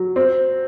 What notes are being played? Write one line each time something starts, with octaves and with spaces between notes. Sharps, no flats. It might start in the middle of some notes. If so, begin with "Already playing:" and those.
Already playing: F#3
C4